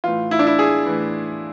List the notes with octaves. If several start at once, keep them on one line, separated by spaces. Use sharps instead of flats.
A2 E3 F4
E4
D4
E4
G#4
A2 E3